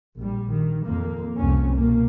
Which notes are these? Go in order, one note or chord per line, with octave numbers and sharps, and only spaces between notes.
A#1 G3
D#3
F2 A#3
C2 F2 C#4
B2 A#3